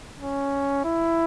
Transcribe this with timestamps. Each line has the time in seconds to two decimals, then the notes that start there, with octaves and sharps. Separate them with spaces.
0.20 C#4
0.84 E4